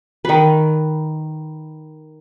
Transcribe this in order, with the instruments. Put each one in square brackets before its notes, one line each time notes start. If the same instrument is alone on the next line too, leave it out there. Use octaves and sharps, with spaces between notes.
[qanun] D#3 B4